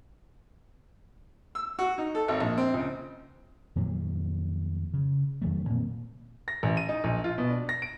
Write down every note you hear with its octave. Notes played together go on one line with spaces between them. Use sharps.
E6
F#4
D#4
A4
G#1
A#1
C4
C#2
F2 A#2 D#3 F#3
C#3
F2 D#3 F#3 A3
A#2 A#3 C4
A#6
A1
D#7
D#4
A#1
F4
B2
D4
A#6
D7